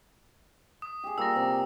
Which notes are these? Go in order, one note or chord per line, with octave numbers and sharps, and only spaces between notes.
D#6
G4 G#4
G3 A#3 F4 E6 A#6
C3 A#4